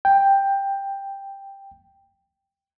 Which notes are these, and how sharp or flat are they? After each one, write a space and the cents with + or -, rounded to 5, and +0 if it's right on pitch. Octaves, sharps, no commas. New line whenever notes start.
G5 +5